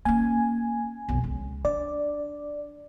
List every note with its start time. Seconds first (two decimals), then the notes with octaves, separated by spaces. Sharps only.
0.05 A#3 C#4 G#5
1.08 B1 F2
1.24 C#2
1.65 D4 D5